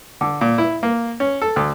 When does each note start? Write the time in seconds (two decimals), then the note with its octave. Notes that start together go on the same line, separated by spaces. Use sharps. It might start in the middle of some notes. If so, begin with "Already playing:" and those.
0.21 D3
0.41 A#2
0.58 E4
0.83 A#3
1.20 C#4
1.42 A4
1.56 D2